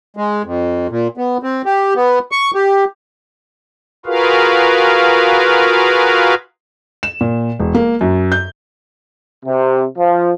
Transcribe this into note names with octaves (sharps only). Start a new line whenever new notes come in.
G#3
F2
A#2
B3
C4
G4
B3
C#6
G4
F4 F#4 G#4 A#4 B4 F5
E7
A#2
E1
A#3
F#2
G6
C3
F3